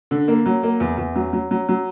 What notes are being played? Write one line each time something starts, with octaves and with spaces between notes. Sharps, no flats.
D3
A#3
F#3
A#3
E2
E2
F#3
F#3
F#3
F#3